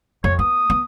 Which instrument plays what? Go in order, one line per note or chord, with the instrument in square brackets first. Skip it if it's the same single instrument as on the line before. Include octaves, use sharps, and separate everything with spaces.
[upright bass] F2 [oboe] C#5
[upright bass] B3 [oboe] D#6
[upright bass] B3